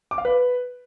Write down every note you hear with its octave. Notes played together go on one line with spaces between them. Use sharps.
D6
F5
B4